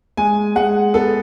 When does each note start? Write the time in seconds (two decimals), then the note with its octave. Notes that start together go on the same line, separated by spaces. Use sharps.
0.17 G#3 G#5
0.55 G#3 F#5
0.94 B3 A4